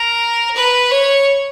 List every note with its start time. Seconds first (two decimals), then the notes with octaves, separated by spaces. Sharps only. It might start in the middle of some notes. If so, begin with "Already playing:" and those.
Already playing: A#4
0.56 B4
0.91 C#5